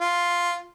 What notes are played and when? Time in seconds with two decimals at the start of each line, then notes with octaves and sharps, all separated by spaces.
0.01 F4